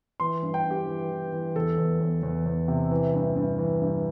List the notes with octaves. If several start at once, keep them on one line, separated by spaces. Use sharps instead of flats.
E3 C6
G2
G5
G2
G4
E3
E3
E3
E2 A4
E2
E2
E2
E2
C3
E3
G2
G2
E3
G2